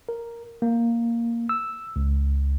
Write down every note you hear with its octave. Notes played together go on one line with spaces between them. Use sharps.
A#4
A#3
E6
C#2